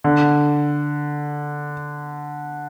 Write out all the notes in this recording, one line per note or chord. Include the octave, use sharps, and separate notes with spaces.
D3